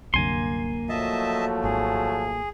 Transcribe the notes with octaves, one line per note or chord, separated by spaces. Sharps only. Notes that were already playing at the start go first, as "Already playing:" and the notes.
C2 F#2 D3 A#3 G#5 C6
F3 F#3 A3 D#5 E5 A5
G#1 G#4